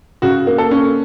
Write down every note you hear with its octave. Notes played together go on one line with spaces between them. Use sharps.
C#3 F#4
A#3
A4
C#4